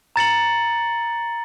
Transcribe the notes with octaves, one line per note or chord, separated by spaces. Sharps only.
A#5 A6 C#7 F#7